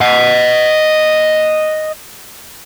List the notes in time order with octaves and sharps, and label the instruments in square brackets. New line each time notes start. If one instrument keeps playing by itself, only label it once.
[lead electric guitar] D#5 F#5